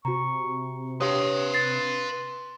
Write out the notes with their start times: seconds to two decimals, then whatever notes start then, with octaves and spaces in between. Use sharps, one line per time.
0.05 C3 F#4 A#5 C#6
1.01 G4 B4 C#5 F5 C6 D#6
1.54 A6 C7